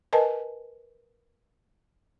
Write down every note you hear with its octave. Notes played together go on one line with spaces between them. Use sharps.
A#4 B4 D#5 G#5 A5